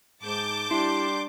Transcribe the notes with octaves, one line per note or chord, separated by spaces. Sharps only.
G#2 A5 D6 G6
G3 D4 E4 C6